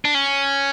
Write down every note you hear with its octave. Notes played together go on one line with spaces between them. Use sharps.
D4
C#4